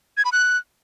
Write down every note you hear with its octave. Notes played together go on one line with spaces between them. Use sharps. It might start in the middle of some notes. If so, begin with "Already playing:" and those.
G#6
B5
F#6